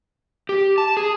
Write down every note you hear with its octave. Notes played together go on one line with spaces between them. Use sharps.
G4
A5
G#4